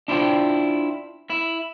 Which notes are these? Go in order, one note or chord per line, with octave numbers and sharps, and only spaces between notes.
D4 E4 F4 C5 G5
E4